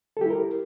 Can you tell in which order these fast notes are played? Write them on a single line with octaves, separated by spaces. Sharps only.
A4 G4 E4 A#4